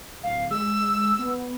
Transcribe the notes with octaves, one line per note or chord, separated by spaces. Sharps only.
D1 F5
G#3 E6
B3